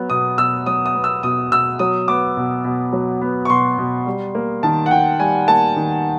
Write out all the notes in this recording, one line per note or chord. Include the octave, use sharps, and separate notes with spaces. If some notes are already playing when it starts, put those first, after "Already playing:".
Already playing: F#3 B3
B2 D#6
B2 E6
F#3 D#6
D#6
B3
E6
B2 D#6
B2 E6
F#3 D#6
B3 D6
B2
B2
F#3
B3
C#6
B2 C6
B2
G3
A#3
D#3 A5
F#5
D#3 G5
G3 G#5
A#3 A5
D#3